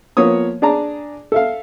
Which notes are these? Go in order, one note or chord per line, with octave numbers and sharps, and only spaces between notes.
F3 A#3 B3 C#5 D#6
D4 G#4 D5 A5 A#5
A4 E5 F5